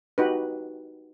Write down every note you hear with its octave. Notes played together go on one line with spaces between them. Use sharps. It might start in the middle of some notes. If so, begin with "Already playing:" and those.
D#4 F#4 G4 B4